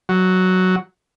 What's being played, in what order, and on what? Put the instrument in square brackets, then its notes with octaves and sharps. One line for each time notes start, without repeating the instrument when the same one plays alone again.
[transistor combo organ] F#3